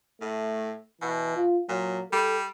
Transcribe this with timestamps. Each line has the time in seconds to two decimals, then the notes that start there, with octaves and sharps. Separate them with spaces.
0.22 A2 A3
1.02 B2 E3
1.37 F4
1.69 A#2 F#3
2.13 G3 A4